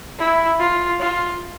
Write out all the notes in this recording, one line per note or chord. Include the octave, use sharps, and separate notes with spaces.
E4
F4
F4